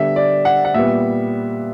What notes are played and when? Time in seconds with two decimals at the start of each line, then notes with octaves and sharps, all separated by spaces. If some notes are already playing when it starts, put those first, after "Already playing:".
Already playing: D3 G3 B3 E5
0.16 D5
0.45 F#5
0.65 F#5
0.74 A#2 G3 B3 E5